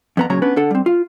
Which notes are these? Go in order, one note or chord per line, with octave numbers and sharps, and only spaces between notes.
F2 B3 A#5
A#2 C#3 F#3 C#5 A#5
B3 C#4 D4 B4
D3 D4 A4 F#5
G3 C4
F4